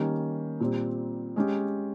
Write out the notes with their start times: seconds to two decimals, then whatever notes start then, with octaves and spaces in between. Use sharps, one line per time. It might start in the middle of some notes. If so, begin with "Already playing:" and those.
Already playing: D#3 G3 A#3 C#4
0.60 A#2 G3 C4
1.36 G#3 C#4 G4